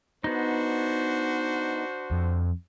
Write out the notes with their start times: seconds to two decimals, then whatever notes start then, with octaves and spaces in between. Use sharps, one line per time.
0.24 B3 D4 D#4 F#4 C5
2.11 F2